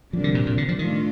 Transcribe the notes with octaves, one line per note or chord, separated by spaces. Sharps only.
C3 F3 G3 A#3 D4
D3
A#2
A#2
D3
F3
A2 D#3 A3 D4 F4